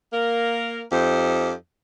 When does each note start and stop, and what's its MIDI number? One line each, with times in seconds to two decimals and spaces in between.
0.13 0.82 58
0.13 0.82 70
0.92 1.52 41
0.92 1.52 63
0.92 1.52 67
0.92 1.52 72